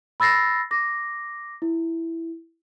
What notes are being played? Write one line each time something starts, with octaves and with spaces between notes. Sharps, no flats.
B5 E6 A6 A#6 C7
D6 A#6
E4